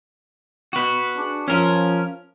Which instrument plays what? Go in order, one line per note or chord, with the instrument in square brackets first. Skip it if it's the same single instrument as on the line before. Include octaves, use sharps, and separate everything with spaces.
[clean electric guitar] F#4 B4
[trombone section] D4 G#4
[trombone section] F3 [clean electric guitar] C#4 A#4